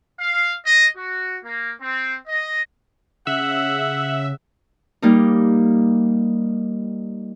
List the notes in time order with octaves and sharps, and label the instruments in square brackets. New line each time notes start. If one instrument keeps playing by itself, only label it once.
[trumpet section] F5
D#5
F#4
A#3
C4
D#5
[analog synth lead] C#3 [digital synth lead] E5 [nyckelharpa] F#5
[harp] G3 A#3 D#4